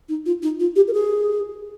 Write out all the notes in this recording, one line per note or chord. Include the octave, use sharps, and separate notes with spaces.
D#4
F4
D#4
F4
G4
A#4
G#4